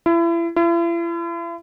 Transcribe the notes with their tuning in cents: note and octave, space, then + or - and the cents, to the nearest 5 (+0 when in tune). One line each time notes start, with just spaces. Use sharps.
E4 +35
E4 +45